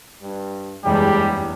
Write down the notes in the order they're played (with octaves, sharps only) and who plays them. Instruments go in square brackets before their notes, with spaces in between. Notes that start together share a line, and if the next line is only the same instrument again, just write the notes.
[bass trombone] G2
[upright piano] F#1 E2 G2 [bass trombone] G3 [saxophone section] G#3 [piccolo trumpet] G4